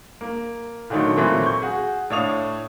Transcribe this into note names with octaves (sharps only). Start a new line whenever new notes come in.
A#3
A#2 D3 D#3 F#3 A3
A#2 E3 F#3 A3 A#3 C4
C#6 G6
F#4 G#4
A2 D4 C#5 F5 D#6 F7